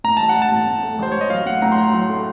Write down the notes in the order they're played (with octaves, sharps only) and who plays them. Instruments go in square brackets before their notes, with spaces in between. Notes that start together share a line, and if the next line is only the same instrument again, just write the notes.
[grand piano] A2 [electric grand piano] A#5
[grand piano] A1 [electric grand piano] A5
[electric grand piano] F#5
[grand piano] A1
[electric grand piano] A5
[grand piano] A2
A2
A3
[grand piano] A1 [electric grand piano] C5
[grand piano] A1 [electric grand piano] C#5
[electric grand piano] D#5
[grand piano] F#3 [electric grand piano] F5
[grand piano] A2 [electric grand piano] F#5
[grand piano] A2 [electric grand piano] A#5
[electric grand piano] C6
[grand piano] F#3 [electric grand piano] A#5
[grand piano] F#3 [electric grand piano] C6
[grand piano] A3